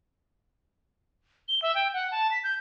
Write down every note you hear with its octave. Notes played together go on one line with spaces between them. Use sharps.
G7
E5
G5
F#5
A5
B6
G6